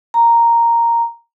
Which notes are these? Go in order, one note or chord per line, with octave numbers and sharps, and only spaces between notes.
A#5